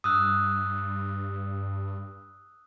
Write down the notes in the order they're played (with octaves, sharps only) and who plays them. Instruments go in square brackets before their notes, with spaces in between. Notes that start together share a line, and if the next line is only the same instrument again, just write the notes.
[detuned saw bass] G2 [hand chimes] D#6 E6 F#6